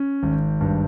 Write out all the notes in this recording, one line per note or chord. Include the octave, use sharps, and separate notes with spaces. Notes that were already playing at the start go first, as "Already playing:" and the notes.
Already playing: C#4
G#1
G2